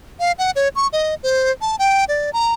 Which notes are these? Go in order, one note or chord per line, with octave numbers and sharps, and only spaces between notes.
F5
F#5
C#5
C#6
D#5
C5
A5
G5
D5
A#5